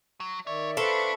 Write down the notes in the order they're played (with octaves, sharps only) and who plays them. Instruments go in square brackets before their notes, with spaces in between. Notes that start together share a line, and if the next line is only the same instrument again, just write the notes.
[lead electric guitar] F#3
[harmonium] D#3 D5 E5 [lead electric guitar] C#5
[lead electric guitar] D4 [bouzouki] A4 [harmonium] B4 C5 F5 [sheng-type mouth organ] E5 B5 C#6